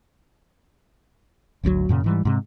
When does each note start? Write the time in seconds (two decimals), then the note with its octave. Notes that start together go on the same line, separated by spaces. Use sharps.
1.63 G#1 D2 C3 F#3
1.89 F#2 A#2 C#3
2.04 G#2 E3 G3
2.25 G#2 C3